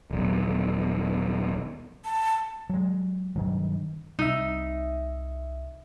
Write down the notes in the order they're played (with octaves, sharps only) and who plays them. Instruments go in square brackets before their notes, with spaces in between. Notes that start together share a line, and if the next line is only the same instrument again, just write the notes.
[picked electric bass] D#1 B1
[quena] A5
[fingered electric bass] F#3 G#3
G2 D#3 F#3
[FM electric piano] C2 E5 [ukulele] D#4